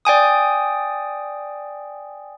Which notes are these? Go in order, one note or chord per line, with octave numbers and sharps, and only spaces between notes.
D5 G5 G#5 D#6